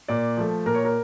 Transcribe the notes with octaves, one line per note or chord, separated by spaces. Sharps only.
A#2 D5
F3 A3
A#2 A#4
C#5
A#4